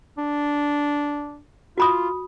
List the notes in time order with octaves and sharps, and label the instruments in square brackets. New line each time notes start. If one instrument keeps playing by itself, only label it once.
[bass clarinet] D4
[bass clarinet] F4 [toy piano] F#4 B5 D#6